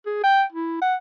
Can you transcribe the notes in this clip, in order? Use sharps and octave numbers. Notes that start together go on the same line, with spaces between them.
G#4
G5
E4
F#5